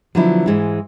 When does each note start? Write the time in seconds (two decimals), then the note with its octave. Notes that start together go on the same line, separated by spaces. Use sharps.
0.15 D3 F3 F#3 B3 E4
0.46 G#2 E3 G#3